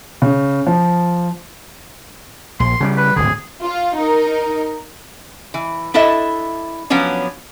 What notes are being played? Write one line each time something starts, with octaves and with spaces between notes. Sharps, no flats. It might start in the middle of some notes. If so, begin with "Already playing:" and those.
C#3
F3
A#1 C6
C#3 F#3 G3
B4
D1 G#1 D3 G#4
F4
D#4 A#4
E3
D4 E4 A4 D#5 E5
F3 F#3 B3 C#4 D4